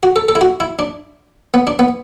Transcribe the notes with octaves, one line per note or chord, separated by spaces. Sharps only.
F#4
A4
A4
E4
F#4
E4
D4
B3
D4
B3